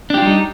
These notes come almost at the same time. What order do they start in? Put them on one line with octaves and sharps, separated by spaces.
D4 G4 F4 G3 D#4